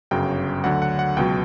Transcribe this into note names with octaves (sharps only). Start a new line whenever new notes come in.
G1 F#2 C#3 F#3 G5
D2 D3 F#3 F#5
F#5
F#5
C#2 B2 F#3 G5